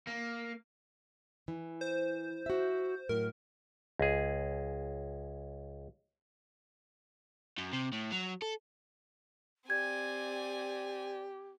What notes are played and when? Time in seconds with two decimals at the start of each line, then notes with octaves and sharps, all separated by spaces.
0.07 A#3
1.48 E3
1.81 C5
2.46 F#4 E5
3.09 A2 F#3 A#4
3.99 C#2 G#4
7.58 F#2
7.73 C3
7.92 A2
8.12 F#3
8.42 A4
9.70 C4 G4 D5 G#5 G#6